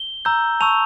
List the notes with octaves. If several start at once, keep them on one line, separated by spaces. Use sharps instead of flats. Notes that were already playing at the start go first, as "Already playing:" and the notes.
Already playing: G7
A#5 E6 G6
A5 C#6 E6 F7